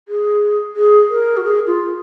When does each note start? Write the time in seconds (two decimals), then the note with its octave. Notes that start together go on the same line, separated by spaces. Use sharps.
0.08 G#4
0.76 G#4
1.10 A#4
1.37 F#4
1.44 G#4
1.67 F4